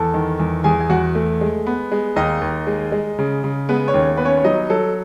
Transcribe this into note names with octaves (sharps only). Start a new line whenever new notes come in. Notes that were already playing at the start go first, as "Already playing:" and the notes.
Already playing: E2 A4 A5
D#3
E2
E2 G#4 G#5
G#5
E2 F#4 F#5
A3
G#3
B3
G#3
D#2 D#4 D#5
D#2
G#3
G#3
C#3
C#3
G#3 B3 B4
C#4 C#5
D#2
B3 B4
C#4 C#5
C#5
F#3 D#4 D#5
F#3 A4